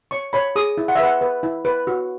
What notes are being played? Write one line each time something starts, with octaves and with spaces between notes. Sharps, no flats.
C#5 C#6
C#5 B5
G#4 D#6
E4
F#5
E5
B4 F#5
B4
E4
B4
F#4